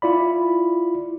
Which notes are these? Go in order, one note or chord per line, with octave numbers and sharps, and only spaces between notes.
E4 F4 D5 B5